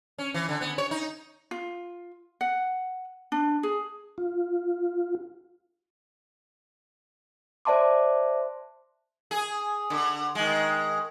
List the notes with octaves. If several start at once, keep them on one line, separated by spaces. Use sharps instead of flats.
C#4
E3
D3
B3
C#5
D#4
F4
F#5
D4
G#4
F4
C5 D5 E5 A5 C6 D6
G#4
D3
D#3 G#3